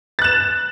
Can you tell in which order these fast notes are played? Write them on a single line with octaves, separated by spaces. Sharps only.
A6 F#6 E7